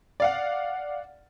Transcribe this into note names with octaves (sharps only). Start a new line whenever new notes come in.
D5 F5 F#5